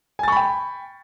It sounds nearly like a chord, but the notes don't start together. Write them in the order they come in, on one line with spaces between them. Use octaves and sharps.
G#5 A6 C#6 B5 G5